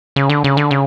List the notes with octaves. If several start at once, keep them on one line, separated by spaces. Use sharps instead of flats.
C#3
D3
C#3
D3
C#3